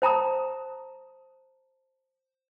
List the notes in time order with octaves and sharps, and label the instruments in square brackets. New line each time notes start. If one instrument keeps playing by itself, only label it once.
[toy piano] C5 A5 A#5 D#6